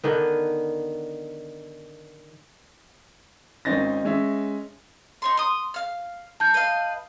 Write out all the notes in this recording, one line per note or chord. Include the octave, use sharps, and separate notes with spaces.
D3 D#3 B3
G#1 C4 C#4 D#4 A6 A#6
G#3 C#4 E5
D#4 C#5 C6
C6 D#6
F5 F6
A#3 A5 G6
B4 D#5 F5